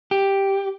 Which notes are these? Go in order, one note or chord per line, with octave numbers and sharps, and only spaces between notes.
G4